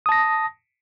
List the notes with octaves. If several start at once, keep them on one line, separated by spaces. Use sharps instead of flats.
A5 D#6 A#6